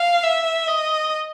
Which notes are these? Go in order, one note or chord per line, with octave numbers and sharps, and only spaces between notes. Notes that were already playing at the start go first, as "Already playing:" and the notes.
Already playing: F5
E5
D#5